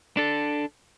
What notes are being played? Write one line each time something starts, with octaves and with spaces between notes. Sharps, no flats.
D4 A4